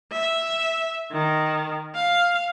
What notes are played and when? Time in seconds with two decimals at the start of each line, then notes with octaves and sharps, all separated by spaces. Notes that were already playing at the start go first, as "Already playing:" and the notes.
0.12 E5
1.12 D#3
1.95 F5